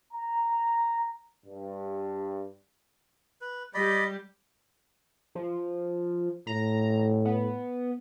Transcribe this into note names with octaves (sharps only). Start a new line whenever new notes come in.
A#5
G2
B4
G3 G4 D5 D#5 B5
F3
A2 A#5
B3